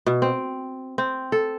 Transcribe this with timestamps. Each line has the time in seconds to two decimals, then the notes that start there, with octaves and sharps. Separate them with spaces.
0.06 B2
0.22 C4
0.98 C4
1.32 A4